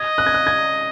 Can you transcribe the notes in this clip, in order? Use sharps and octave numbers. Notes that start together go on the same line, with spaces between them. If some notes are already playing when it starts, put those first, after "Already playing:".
Already playing: D#5 G#6
F#6
G#6
F#6
G#6